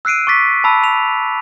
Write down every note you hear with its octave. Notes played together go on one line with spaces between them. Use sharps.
E6 F#6 C7 D7 D#7
C#6 D6 A6 B6
A5 B5 E6
F7